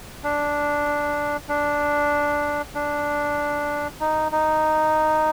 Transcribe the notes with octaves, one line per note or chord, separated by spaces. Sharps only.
D4
D4
D4
D#4
D#4